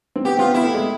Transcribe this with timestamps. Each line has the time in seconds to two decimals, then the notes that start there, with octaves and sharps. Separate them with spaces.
0.16 C4
0.25 B3 G4
0.39 B3 F4
0.54 E4
0.64 A3
0.74 G#3